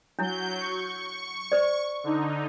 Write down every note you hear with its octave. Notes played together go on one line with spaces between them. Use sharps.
F#3 D4 E4 G6
C#6
C5 D5
D3 D#4